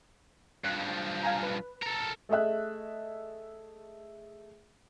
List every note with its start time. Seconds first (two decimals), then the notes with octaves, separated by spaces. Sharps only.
0.65 G2 F3 F#6
1.23 F5 G#5 A#5
1.43 B4
1.83 A4 A#4
2.29 A3 G#4 D#5 E5 F#6